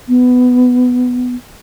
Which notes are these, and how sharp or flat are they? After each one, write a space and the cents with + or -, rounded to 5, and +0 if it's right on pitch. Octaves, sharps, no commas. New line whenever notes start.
B3 +10